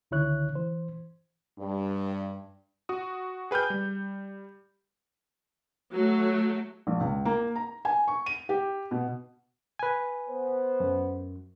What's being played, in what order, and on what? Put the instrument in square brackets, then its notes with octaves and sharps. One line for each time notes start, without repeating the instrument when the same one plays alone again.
[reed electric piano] C#2 D3 D#3 E4 C#5 F#6
E3 C5
[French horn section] G2
[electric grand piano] F#4 D#6
G#4 B4 G5 F6 G6
G3
[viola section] F#3 A3
[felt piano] A#1
C#2
A#3
A#5
G#5
C#6
D#7
G4
B2
[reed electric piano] B4 G#5
[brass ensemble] B3 C5
[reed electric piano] F#2